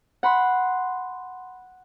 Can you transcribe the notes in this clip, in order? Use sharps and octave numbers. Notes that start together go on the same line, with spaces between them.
F#5 B5 C6